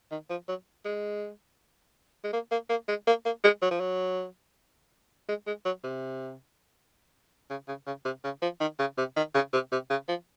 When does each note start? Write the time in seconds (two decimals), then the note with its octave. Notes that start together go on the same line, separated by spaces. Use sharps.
0.11 D#3
0.30 F3
0.48 F#3
0.85 G#3
2.24 G#3
2.33 A#3
2.51 A#3
2.69 A#3
2.88 G#3
3.07 A#3
3.25 A#3
3.44 G#3
3.62 F#3
3.71 F3
3.80 F#3
5.28 G#3
5.47 G#3
5.65 F#3
5.84 C3
7.50 C#3
7.68 C#3
7.87 C#3
8.05 C3
8.24 C#3
8.42 F3
8.60 D#3
8.79 C#3
8.98 C3
9.16 D#3
9.34 C#3
9.53 C3
9.72 C3
9.90 C#3
10.08 F3